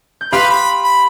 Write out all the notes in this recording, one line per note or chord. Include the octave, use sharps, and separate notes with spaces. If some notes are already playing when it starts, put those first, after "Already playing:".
G6
G4 B4 F5 B5 C6
B5
B5